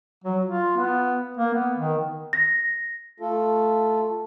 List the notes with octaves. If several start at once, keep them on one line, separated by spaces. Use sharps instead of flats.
F#3
F4
B3
A#3
B3
D#3
A#6
A3 F4 A4